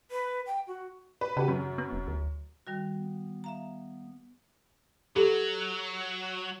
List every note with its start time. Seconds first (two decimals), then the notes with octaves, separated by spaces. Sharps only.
0.11 B4
0.46 G5
0.67 F#4
1.21 B4
1.37 C#3 F#4 G4 B4
1.48 F#2
1.78 B3
1.93 E1
2.08 D2
2.67 D#3 G3 F#4
2.97 B3
3.44 E5 F5 A#5
5.16 F#3 G4 A4